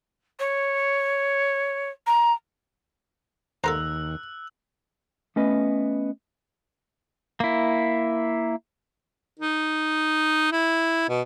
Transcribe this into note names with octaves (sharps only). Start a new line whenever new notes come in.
C#5
A#5
D#2 A4 A#4 C5 A#5 E6 F#6
A3 B3 C#4 B4 D#5
A#3 E4
D#4
E4
B2